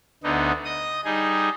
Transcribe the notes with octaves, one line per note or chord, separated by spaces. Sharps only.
D2 D3 B3 D#4
D#5 D#6
G3 D#4 G#4